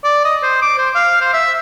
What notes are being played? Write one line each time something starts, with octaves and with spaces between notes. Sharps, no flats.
D5
D#5
C5
D6
C5
F5
C5
E5